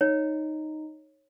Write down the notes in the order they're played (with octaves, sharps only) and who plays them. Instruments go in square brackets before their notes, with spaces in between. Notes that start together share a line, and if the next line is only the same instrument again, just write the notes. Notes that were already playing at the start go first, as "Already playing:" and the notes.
[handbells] D#4 [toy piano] C#5